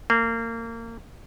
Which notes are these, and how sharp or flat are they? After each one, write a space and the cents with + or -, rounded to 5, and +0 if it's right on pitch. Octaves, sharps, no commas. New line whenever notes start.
A#3 -25